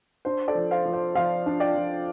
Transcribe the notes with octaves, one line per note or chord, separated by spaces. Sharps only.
D4 C5
A4 D5
F3
C5 F5
F3
C5
F3 C5 F5
D4
D5 G5
F3